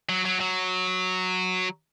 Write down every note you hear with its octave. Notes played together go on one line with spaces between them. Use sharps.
F#3
F#3
F#3